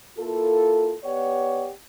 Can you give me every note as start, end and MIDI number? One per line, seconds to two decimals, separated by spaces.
0.18 0.95 58
0.18 0.95 64
0.18 0.95 65
0.18 0.95 69
1.04 1.69 59
1.04 1.69 67
1.04 1.69 73
1.04 1.69 74
1.04 1.69 78